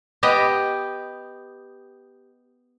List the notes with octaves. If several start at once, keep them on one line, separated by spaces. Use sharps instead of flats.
B3 G4 D#5